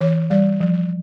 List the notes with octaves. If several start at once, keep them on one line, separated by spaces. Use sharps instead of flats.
E3 C#5
G3 D5
F3